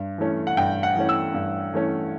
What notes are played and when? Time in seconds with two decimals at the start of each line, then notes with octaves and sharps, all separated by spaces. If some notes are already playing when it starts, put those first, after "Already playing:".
Already playing: G2
0.18 E3 A3 C#4
0.47 F#5
0.57 G2 G5
0.83 F#5
0.95 E3 A3 C#4
1.09 E6
1.34 G2
1.74 E3 A3 C#4